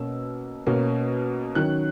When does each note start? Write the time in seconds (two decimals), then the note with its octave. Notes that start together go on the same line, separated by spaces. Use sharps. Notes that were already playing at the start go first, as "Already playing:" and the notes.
Already playing: B2 A#3 C#4 E6
0.67 B2 A#3 C#4
1.55 D#3 F#3 C#4 F#6